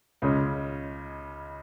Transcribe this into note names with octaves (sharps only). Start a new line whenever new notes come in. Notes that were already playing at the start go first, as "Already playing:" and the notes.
C#2 C#3 G#3 C#4 G#4